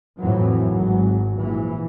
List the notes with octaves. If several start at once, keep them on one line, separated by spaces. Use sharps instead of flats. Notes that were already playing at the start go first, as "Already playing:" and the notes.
F2 A2 E3 F#3
G#1 F#3
A#1 E3